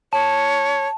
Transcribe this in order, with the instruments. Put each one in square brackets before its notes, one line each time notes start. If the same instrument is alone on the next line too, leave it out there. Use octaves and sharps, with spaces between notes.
[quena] C#5 [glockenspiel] A5